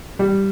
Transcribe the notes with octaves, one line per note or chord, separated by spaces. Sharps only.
G3